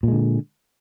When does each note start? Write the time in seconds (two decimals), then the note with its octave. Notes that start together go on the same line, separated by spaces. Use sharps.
0.03 A#2
0.08 G#3
0.13 D3